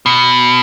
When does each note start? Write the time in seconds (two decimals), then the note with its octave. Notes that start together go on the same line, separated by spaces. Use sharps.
0.06 B2